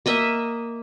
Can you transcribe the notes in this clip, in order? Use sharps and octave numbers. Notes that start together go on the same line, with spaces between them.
A#3 D#5 E5